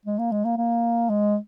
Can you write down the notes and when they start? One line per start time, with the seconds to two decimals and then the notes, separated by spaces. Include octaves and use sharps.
0.06 G#3
0.19 A#3
0.32 G#3
0.45 A#3
0.57 A#3
1.09 G#3